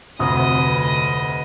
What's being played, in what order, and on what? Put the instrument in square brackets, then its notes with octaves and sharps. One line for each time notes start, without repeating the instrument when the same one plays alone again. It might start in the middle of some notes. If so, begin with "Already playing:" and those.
[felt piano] F1 D2 D#6 [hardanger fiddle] B4 D#5